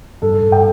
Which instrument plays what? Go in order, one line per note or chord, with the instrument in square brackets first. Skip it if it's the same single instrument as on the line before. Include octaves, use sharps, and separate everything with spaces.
[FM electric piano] G2 [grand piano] A4
[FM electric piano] G2
[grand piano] G5